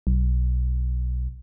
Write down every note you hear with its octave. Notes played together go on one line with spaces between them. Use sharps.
B1